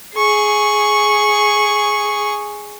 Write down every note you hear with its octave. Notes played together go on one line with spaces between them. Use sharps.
G#4 C#6